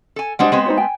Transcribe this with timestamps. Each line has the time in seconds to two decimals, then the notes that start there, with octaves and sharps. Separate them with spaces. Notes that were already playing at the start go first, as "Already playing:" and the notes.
0.16 A4 G#5
0.39 G3 G#3 D4 G4 C5 F#5
0.52 G#3 B3 C4
0.66 D#4 C5 C#5
0.77 G5 G#5